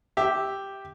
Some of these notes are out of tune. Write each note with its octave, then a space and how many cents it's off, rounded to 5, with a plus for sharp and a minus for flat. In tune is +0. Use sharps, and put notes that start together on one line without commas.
G4 +0 E5 -10